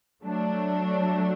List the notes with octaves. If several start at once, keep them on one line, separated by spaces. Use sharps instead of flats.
F#3 A3 D4